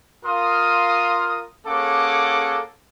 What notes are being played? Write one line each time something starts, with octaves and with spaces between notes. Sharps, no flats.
F4 A#4 F5 C6 D#6
A#3 C#4 G#4 A4 F#5 D6